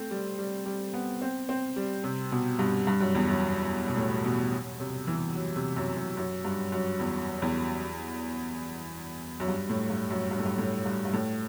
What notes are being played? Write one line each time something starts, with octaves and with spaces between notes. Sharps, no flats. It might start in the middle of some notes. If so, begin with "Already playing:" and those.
Already playing: A3 C4
G3
G3
G3
B3
C4
C4
G3
C3
B2
G2
G2
F#2
E2
F#2
B2
A2
B2
C3
E3
F#3
C3
F#2
F#2
F#2
G2
F#2
E2
E2
F#2
G2
A2
G2
F#2
G2
A2
G2
A2
G2
G2
A2